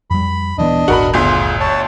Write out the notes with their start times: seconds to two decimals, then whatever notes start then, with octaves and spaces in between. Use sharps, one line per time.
0.10 F2 G3 B5
0.58 D#1 E3 B3 D4 D#5
0.88 D#1 G#1 F#4 A#4 B5
1.14 G1 D2 F4 G#4 C6
1.60 C#5 A5